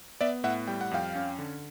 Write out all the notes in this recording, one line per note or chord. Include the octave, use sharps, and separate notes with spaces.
B3 D5 E5
A2 E5 F#5
G3 G5
F#5
F2 F5 G5
C#4
D3